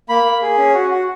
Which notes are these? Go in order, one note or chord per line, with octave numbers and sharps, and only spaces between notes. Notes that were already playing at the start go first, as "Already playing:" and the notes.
A#3 B5
A#3
G#4
C#4
F#4
F#4